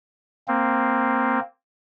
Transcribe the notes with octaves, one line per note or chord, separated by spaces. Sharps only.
A#3 C4